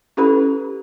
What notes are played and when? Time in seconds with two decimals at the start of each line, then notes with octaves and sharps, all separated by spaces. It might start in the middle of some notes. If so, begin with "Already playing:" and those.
0.17 C#4 E4 G4 A4 B4 B5